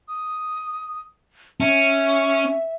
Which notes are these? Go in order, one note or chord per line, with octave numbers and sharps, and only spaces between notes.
D#6
C#4 E5